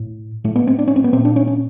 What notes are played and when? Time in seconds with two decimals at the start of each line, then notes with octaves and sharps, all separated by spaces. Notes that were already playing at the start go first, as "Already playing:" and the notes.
Already playing: A2
0.44 A2 A3
0.56 B3
0.67 C4
0.79 D4
0.87 C#4
0.96 C4
1.04 B3
1.13 A#2 C4
1.25 D4
1.36 C#4
1.47 C#4